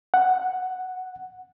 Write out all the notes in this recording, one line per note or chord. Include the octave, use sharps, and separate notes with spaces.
F#5